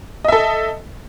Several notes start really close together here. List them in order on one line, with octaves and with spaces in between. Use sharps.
D#5 E5 A4